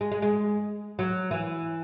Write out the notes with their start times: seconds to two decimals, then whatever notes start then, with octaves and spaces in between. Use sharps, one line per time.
0.01 G#3
0.12 G#3
0.22 G#3
0.99 F#3
1.31 E3